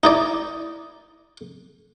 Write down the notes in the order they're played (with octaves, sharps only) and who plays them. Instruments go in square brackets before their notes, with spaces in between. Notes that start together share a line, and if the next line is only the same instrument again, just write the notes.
[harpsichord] D#4 E4 D5